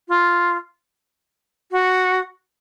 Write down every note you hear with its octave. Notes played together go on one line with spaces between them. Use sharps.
F4
F#4